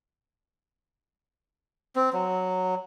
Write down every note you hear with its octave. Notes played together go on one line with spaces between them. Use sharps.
C4
F#3